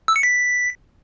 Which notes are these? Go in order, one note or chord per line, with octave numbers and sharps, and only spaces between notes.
E6
C#7
B6